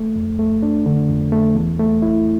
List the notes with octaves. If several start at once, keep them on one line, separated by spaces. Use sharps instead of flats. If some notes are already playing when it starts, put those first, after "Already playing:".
Already playing: A3
F2
A3
D4
D3
F2
A3
E2
A3
E4